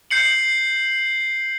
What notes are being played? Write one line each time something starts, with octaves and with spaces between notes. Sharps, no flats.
G6 C7 C#7 F#7